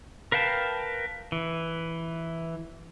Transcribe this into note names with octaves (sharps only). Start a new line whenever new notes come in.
A#4 B4 F5 G5 A5
E3